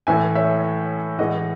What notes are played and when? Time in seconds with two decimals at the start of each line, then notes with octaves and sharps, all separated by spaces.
0.07 A2 E3 A3 E5 G#5
0.35 C#5 E5
1.18 A2 E3 G#3 D#5 F#5